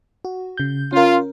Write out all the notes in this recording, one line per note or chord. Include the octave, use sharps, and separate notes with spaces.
F#4
C#3 G6
C#4 F4 A#4